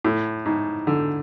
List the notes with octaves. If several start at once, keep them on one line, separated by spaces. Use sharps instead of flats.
A2
G#2
D3